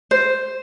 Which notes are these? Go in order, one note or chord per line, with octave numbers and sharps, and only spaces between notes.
C5